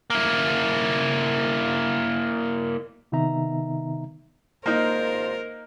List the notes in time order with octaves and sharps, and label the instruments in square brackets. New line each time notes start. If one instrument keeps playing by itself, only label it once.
[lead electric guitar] A#3 E4
[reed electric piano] C3 D#3 B3 D#4 E5 A#5
[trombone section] G#1 F4 C5 [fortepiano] A#3 D#4 [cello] A#4